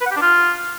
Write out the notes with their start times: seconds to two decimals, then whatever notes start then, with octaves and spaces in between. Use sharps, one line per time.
0.01 B4
0.06 F#5
0.11 G4
0.16 D4
0.21 F4